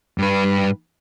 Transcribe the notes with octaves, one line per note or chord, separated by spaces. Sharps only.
G2 B4